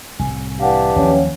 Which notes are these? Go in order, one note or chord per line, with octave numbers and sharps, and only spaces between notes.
C2 A2 G#5
E3 D4 G4 F5 F#5
D#2 F3 F#3 C#4